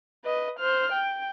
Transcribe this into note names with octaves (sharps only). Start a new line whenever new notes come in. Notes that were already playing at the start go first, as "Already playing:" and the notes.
B4 D#5
C5 F6
G5